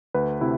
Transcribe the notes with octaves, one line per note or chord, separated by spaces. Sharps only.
D2 B4
C3 E4